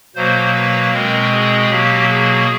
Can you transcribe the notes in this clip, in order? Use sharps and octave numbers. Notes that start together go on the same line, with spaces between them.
B2 F#3 A#3 C5
B4
B2 G#3 C4 A#4
G#4
B2 F#3 A#3 G4
G#4